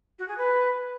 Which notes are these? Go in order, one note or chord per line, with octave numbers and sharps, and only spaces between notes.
F#4
G#4
B4